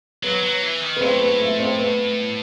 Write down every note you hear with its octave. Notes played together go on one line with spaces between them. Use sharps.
F#3 B3
F#3
E3
D#3
B3
A2 C4
B3
A3
C4
B3